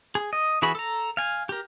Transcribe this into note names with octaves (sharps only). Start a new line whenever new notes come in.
G#4
D#5
E3 F#4 G#4 B5
A4 A#5
F5 G#5
G4 A#4